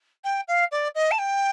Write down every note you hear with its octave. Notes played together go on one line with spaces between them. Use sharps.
G5
F5
D5
D#5
A5
G5